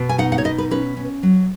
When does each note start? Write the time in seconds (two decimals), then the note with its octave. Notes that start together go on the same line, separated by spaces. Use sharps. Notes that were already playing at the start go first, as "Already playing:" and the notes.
Already playing: B2 B3
0.09 G#5
0.18 D#4 F#5
0.32 F#5
0.38 C#5
0.44 B2 D#5
0.58 B4
0.71 C#4 B4
0.97 C#4
1.23 F#3